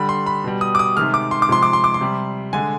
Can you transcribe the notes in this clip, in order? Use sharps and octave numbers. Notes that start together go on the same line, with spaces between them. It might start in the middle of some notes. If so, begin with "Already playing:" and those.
Already playing: D3 G3 B5
C6
B5
B2 G3
D#6
D6
D#6
C3 D#3 G#3 F6
D6
C6
D6
C3 F3 G#3 C6
D6
C6
D6
C6
C3 G3
D3 G#3 G#5